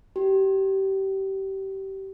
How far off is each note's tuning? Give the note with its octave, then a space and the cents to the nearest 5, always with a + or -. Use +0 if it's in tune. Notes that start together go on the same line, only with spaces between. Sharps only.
G4 -25